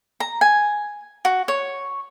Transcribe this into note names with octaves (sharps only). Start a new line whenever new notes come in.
A#5
G#5
F#4
C#5